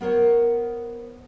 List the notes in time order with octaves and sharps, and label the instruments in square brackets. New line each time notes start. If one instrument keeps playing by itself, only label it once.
[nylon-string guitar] B3 A#4 C5 C#5